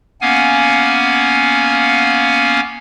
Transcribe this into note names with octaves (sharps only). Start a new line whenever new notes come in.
A#3 B3 C#4 F5 F#5 G#5